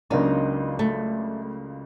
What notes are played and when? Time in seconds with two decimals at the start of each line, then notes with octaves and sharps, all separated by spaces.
0.10 C#2 C#3 F#3 A#3 D4 D#4
0.79 A3